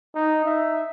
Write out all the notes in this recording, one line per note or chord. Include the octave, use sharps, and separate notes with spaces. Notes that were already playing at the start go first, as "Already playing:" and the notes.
D#4
E5